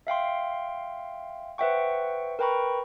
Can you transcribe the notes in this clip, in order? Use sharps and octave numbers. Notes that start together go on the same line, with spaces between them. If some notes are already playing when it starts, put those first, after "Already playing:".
E5 F5 G5 C6
B4 C5 E5 F#5 G5 C#6
A#4 B4 G5 A#5 B5 C#6